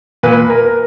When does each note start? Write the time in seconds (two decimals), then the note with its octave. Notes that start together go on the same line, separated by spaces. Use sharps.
0.23 A#2 B4
0.50 A#4